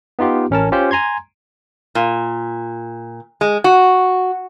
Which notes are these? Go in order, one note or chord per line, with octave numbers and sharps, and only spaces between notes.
B3 D#4 F4 G4
A1 C#4 A#4 A5
C#4 F4 G4 C5
G#5 A#5 C6 G#6
A#2
G#3
F#4